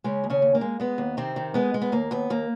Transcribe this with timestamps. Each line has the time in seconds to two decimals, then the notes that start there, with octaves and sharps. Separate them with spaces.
0.04 C#3 G#3 C#4
0.24 D#2
0.30 C#3 C#4
0.42 D#2
0.55 A#3
0.61 G#3
0.80 G#3 B3
0.98 D#2
1.17 C3 D#3 C4
1.36 D#3
1.54 G#3 B3
1.74 G#3
1.82 B3
1.92 D#2 A#3
2.11 D#2 B3
2.30 D#2 A#3